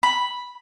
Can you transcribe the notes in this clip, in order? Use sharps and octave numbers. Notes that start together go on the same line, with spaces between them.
B5